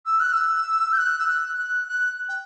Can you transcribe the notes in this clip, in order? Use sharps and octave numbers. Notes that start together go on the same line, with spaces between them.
E6
F#6
E6
G6
F#6
E6
F#6
F#6
F#6
G5